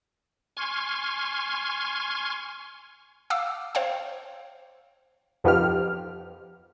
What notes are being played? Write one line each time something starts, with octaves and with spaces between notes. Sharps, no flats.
G#5 C6 C#6 F6 G#6
F5 F#5 D6 E6
C5 C#5 F5 G5
F2 F3 B3 D#4 G4 F6